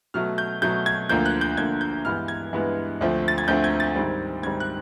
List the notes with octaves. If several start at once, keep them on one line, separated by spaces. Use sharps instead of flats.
B2 F#3 A3 F6
G6
B2 F#3 A3 G6
G#6
D2 D3 F3 A#3 G6
F#6
G6
D2 D3 F3 A#3 G#6
G6
G2 E3 G#3 B3 F6
G#6
G2 E3 G#3 B3
D2 D3 F3 A3 C4
A6
G#6
D2 D3 F3 A3 C4 G6
G#6
A6
G#2 D#3 G3 C4
G#2 D#3 G3 C4 G#6
F#6